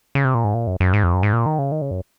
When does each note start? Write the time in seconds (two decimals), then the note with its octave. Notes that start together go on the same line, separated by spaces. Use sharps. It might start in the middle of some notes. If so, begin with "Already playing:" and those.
0.15 C#3
0.25 C3
0.34 A#2
0.44 G#2
0.54 A#2
0.67 F#2
0.80 F#2
0.93 G#2
1.03 F2
1.13 F#2
1.23 G#2
1.33 A#2
1.46 D#3
1.59 C#3
1.72 D#3
1.82 C#3
1.91 F#2